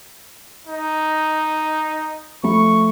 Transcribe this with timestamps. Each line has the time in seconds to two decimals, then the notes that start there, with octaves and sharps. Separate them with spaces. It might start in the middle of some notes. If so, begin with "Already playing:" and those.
0.67 D#4
2.43 F3 A3 B5 C#6